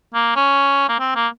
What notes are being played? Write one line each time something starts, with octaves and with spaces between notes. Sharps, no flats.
A#3
C#4
A#3
C4
A#3